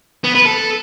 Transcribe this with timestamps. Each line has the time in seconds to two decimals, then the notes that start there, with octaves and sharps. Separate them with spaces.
0.24 B3
0.35 B4
0.46 A4